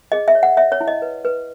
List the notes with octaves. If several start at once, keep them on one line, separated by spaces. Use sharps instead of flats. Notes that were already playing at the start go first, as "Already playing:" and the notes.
G#4 D#5
E5
C#5
F#5
C#5 E5
C#5
E4
D#5
B4
B4